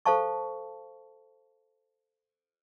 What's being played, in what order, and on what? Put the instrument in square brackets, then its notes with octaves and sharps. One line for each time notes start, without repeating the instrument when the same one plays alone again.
[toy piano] A4 C5 F5 A5 C#6